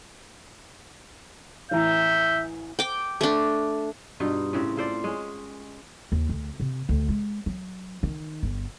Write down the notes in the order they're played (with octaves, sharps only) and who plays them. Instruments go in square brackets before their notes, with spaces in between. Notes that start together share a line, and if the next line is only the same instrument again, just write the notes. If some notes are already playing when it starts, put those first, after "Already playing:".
[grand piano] A1 E3 A#5 [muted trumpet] E5 [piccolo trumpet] G6
[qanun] G5 D6
A3 D4
[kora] G2 B2 D#4 F4
A2 C#3 C4
F4 A4 C5 D5
G#3 C#4
[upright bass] D#2
D2
C3
D2
G#3
F#3
D#3
G1